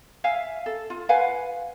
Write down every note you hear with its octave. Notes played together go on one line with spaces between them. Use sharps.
E5 F5 G#5
A4
F4
B4 F5 F#5 G#5